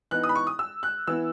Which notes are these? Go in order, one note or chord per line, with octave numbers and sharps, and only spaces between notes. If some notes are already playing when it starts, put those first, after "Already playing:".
E3 B3 D#4 F#6
D#6
B5
C#6
D#6
E6
F#6
E3 B3 E4 E6